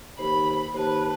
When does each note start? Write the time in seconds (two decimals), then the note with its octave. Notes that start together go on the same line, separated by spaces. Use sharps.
0.19 D#2 C5 B5
0.74 D#2 B4 C5 A5